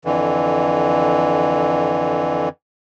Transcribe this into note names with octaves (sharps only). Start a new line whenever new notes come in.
F2 D3 E3